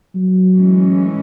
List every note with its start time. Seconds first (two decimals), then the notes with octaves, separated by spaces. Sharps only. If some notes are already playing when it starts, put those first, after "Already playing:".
0.15 F#3
0.59 A2 E3 G#3 C#4